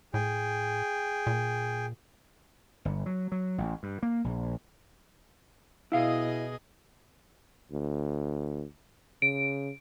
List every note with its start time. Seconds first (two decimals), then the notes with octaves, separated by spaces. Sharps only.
0.14 A2 G#4 G5
1.27 A#2
2.85 G1
3.06 F#3
3.32 F#3
3.58 A1
3.83 G2
4.03 A#3
4.24 A#1
5.92 B2 E4 G#4 D#5 F5
7.72 D2
9.22 C#3 D7